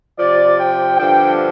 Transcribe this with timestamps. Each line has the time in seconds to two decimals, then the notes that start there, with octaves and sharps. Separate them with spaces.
0.18 C3 F3 D5
0.58 G5
0.97 G2 D3 F3 G5